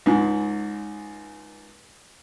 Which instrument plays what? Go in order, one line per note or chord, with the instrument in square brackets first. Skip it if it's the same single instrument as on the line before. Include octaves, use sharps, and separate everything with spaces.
[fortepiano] C#2 G#2